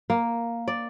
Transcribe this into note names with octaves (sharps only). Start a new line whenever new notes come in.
A#3
D5